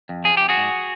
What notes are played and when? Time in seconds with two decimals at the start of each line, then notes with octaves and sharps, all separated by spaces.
0.09 F2
0.24 F3 G#4
0.37 F2 G4
0.49 F#4 G#4
0.57 G#2